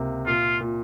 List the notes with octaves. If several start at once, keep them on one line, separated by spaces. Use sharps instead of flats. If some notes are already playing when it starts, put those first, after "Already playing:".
Already playing: C#2 C3 A#3
A#2 F4
A#2